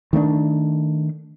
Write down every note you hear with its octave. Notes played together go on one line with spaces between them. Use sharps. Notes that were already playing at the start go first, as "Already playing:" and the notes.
D#3 A3 C4 D4